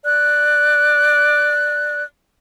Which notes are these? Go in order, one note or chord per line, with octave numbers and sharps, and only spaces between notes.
D5 F#6